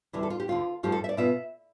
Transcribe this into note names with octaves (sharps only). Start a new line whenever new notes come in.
D2 C3 E3 G3 D4
A4
F4
G4
D2 D3 A3 F4
G2 F3 A3 G4
A4
E5
D5
B2 B3 F4 E5